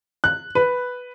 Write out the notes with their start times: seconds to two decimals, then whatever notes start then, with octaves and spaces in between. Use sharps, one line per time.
0.24 F#6
0.55 B4